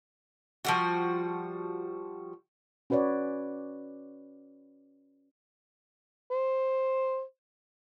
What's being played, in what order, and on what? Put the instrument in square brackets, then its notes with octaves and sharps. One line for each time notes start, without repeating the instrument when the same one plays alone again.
[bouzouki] F3 G3 F#4
[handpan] C#4 F#4 B4 C#5 D5
[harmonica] C5